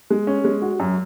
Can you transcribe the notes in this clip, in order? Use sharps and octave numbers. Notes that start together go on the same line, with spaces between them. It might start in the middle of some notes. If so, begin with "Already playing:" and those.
G#3
C#4
G#3
F#4
F#2